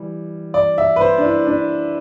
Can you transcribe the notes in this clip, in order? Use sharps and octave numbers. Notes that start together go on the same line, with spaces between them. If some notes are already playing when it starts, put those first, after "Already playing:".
Already playing: E3 G3
D5
E5
B4
C5
D4
E4
D4